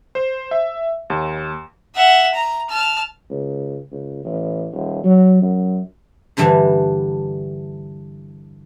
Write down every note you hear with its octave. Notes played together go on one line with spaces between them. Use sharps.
C5
E5
D#2
E5 F#5
A#5
A5 F6
C#2
C#2
A1
D#1
F#3
F#2
G2 D3 E3 G3 D4